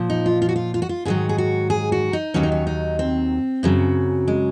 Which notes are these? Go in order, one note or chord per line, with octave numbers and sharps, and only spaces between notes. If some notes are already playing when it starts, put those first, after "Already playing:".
Already playing: A#2 F3
D#4
F4
F4
F#4
F4
F4
F#4
F4
G#2 D#3 F#3 G#4
G#4
F#4
G#4
F#4
D#4
D#2 D#3 F#3 C#4
D#4
C#4
D#4
C4
F#2 C#3 F#3
G#3